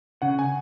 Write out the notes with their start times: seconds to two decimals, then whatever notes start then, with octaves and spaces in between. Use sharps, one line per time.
0.22 C#3 F#5
0.39 G#5